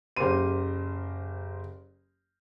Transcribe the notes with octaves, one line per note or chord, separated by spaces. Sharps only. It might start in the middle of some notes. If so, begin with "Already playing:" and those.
F#1 G4 A#4 C5 C6 D#7